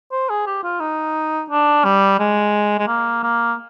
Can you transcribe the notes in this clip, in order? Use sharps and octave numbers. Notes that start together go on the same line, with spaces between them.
C5
G#4
G4
F4
D#4
D4
G3
G#3
G#3
A#3
A#3